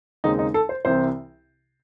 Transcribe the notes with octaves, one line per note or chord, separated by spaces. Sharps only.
D#2 C#3 G#3 C4 D#4
D#4
A4
C5
C2 C3 E3 C4 C5